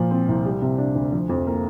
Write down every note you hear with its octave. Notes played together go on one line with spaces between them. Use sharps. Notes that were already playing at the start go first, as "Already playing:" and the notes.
Already playing: A#2 F3
C4
C2
G3
C3
D4
D2
F3
F2
A#3